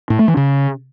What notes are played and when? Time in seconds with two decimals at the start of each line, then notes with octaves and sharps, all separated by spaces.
0.10 A2
0.19 A3
0.28 E3
0.37 C#3